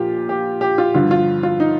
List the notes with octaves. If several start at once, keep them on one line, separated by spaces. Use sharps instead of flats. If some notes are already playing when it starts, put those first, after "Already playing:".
Already playing: A#2 F3 F4 G4
G4
G4
F4
G2 D3 F3 F4
F4
F4
D#4